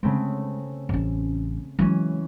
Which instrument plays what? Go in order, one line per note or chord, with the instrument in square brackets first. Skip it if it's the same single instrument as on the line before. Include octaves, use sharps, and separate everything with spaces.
[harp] C#3 A3 C4 [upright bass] G#3
[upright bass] A1 C#4
[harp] E3 C#4 [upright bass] F#3 G#3